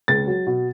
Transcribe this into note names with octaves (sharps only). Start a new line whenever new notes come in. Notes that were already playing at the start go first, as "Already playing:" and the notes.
C#2 A6
F#3
B2